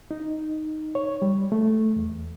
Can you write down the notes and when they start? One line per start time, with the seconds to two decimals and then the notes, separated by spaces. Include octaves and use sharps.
0.11 D#4
0.95 C#5
1.22 G3
1.52 A3
1.96 E2